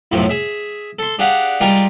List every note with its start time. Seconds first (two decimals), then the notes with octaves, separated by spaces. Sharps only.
0.12 B1 F#2 A2 C3 F3
0.29 G#4 E5
0.99 A4 C6
1.19 D4 G4 G#4 F5 F#5
1.61 G3 G#3 F4 G4 G#4 A#4